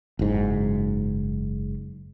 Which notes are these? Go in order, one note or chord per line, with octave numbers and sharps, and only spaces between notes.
F#1 G#2